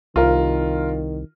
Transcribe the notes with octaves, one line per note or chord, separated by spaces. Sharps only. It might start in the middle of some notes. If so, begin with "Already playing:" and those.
C2 D#3 F4 A#4